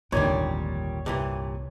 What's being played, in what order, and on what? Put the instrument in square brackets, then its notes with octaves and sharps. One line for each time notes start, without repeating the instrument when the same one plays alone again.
[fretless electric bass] D#1 G#1 D3 [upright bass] F2 [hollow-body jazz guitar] A#2 D#3 G3 [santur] C#5
[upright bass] C2 [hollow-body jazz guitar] G2 A#2 E3